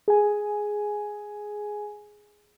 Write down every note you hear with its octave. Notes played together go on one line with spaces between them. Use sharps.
G#4 G#5